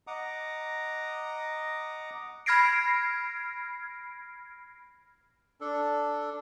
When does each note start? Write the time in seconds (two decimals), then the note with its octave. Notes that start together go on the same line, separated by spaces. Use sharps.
0.07 D#5 F#5 A#5 D6 D#6
2.46 B5 F6 G#6 A#6 C7 D7
5.61 D4 A4